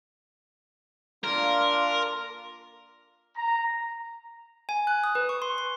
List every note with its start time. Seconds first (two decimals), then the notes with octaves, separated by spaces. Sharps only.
1.24 A#3 D4 F4 A#4
3.36 A#5
4.69 G#5
4.87 F#6
5.04 D#6
5.15 B4
5.29 C#6
5.42 C6
5.58 C6